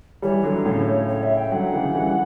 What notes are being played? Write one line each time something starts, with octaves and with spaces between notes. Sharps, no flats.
E3 G3 C#5
D3 F#3
A2 C#3
C#5
E5
G5
D3 F#3 F#5
C#3 E3
E3 G3